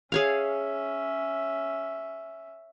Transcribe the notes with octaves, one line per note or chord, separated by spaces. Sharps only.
C#4 G#4 C#5 E5 F5